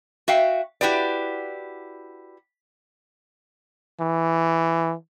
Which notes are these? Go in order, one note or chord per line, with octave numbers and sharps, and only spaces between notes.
F#4 E5 F5 G5
E4 F#4 G4 B4 D5
E3